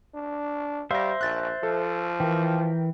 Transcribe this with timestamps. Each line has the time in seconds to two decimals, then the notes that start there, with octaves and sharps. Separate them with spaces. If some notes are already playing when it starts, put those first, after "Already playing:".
0.14 D4
0.91 G3 C5 E5 F5 A#6
1.21 A#1 F#6 A6
1.63 F3 A4
2.20 E3 A#4 G5